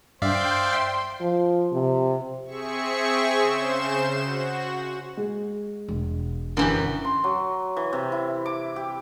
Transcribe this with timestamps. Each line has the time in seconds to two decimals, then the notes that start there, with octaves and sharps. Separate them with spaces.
0.22 G2 C5 D5 E5 F5 G5 C6
1.21 F3
1.73 C3
2.45 C4 G#4 E5 C#6
3.35 C#3 C5 E7
4.18 F#4
5.17 G#3 G#4
5.88 E1
6.57 F#2 D3 E3 G4
7.05 C6
7.24 F#3
7.77 E3
7.93 C3
8.12 E4
8.46 D6
8.76 G4